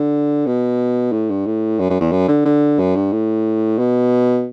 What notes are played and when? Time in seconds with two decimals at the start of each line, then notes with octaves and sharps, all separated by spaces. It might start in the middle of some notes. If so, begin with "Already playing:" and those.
Already playing: D3
0.46 B2
1.12 A2
1.30 G2
1.46 A2
1.80 F#2
1.90 F#2
2.01 E2
2.12 F#2
2.28 D3
2.46 D3
2.79 F#2
2.96 G2
3.13 A2
3.79 B2